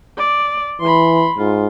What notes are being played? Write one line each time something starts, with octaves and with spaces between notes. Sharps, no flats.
D5
E3 B5 C6
G#2 F4